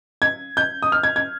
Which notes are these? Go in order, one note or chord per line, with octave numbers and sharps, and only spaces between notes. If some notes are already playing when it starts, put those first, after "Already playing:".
G#6
G6
D#6
F6
G#6
G#6